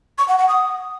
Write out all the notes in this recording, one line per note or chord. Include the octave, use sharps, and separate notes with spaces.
C#6
F#5
F#5
D#6